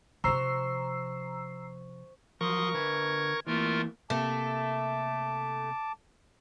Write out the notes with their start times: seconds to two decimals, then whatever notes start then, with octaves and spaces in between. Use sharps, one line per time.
0.24 C3 F3 C5 A#5 C#6 E6 C7
2.41 F3 F#3 A#4 C6 C#6 D#6
2.74 D3 B4 G#6
3.47 E3 A3 A#3 F4 A#4
4.10 C3 A3 A#3 A5 D6